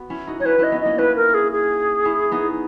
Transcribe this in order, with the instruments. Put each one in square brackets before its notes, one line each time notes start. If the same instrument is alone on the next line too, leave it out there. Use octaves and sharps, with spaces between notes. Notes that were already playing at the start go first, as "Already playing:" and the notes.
Already playing: [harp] B3 F#4
C#4 E4
D#4 F#4
[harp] D#4 [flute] C#5
[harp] C#4 E4 [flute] B4
[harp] C#4 E4 [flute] D#5
[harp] B3 D#4
[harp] A#3 C#4 [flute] D#5
[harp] C#4 E4 [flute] B4
[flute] A#4
G#4
G#4
[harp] C#4 E4
B3 D#4